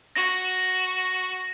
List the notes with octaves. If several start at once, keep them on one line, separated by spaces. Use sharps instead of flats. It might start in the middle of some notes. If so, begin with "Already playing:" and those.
F#4 A#6